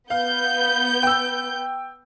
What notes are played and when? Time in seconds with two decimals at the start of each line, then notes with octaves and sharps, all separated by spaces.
0.10 B3 F5 G6
1.03 G5 E6